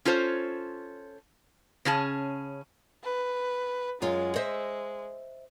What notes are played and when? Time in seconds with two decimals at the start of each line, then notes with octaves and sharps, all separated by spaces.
0.05 C#4 F4 A4 C5 C#5
1.85 C#3 C#4 G#4 A5
3.04 B4
4.02 F#2 G#3 F4
4.36 C5 D#5 E5